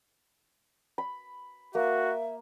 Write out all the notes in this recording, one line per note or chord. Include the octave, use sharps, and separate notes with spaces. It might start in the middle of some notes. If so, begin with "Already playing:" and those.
B5
A#3 F#4 E5